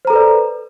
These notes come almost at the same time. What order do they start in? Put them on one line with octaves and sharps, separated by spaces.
C5 A#5 A4 B4 D5